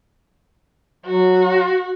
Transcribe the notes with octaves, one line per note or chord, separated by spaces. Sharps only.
F#3 F#4